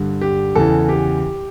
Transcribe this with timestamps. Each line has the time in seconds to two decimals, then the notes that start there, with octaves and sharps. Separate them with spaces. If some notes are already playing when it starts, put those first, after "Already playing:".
Already playing: G2 D3
0.21 G4
0.55 E2 C#3 E3 A4
0.89 G4